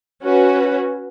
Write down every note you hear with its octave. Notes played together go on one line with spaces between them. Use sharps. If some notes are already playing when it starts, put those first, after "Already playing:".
C#4 F#4 B4